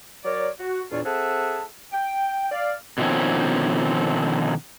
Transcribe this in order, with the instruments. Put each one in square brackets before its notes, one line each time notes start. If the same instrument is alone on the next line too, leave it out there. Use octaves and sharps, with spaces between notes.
[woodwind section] F#3 A#4 C#5 D5
F#4
E2 A#2 D4 F4 C#5 D5
C4 G#4 A4 E5 F#5 A5
G5
D5 F5
[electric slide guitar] B2 D3 D#3 F3 C4 C#4